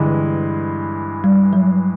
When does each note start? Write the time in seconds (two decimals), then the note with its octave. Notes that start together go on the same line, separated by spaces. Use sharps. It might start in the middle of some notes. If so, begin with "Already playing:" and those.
Already playing: G2 D3 E3 G#3
1.24 G3
1.53 F#3